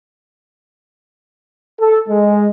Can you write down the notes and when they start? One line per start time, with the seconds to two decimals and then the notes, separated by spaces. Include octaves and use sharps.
1.80 A4
2.09 G#3